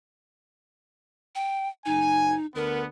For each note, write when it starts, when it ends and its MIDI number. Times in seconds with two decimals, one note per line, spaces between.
1.35 1.68 79
1.86 2.34 30
1.86 2.46 63
1.86 2.34 80
2.55 2.86 38
2.55 2.86 50
2.55 2.86 59
2.55 2.81 70